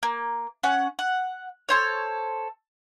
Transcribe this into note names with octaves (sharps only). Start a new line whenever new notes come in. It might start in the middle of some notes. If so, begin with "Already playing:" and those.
A#3
C#4 F#5
F#5
A4 C5 C#5